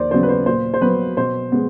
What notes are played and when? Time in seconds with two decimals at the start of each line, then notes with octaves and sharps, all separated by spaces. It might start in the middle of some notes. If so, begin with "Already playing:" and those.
Already playing: D#2 C5 D5
0.11 C#3 F#3 B3 C5
0.23 B4
0.29 C5
0.46 A#2 C5
0.74 C5
0.81 F#3 B3 B4
1.17 B2 C5
1.52 G#3 B3